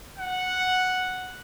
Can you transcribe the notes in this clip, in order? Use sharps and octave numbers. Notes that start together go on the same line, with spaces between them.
F#5